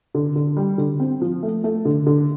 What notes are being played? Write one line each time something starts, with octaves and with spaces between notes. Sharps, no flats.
D3
D3
G3
D3
C4
F3
A3
A3
D3
D3